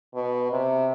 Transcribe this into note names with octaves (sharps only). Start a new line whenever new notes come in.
B2
C3